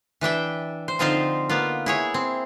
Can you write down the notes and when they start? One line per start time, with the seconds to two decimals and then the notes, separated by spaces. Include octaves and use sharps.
0.21 E3 D4 E5 G5
0.88 C5
0.99 D3 F3 C4 D#4 F4 C5
1.49 A#3 B3 F4
1.86 E4 G#4 C#5
2.14 C4